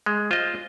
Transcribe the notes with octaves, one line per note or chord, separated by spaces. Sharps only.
G#3
F4 C5 D#5